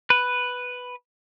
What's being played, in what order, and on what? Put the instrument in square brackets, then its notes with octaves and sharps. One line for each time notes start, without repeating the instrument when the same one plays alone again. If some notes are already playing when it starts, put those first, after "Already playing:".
[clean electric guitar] B4